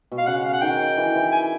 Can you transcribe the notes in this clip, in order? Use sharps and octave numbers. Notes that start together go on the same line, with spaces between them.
B2
F5
C#3 F#5
F5
F#5
D#3 G5
E3
E3
G#5